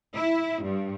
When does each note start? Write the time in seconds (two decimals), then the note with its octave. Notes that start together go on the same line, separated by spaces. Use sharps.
0.14 E4
0.62 G2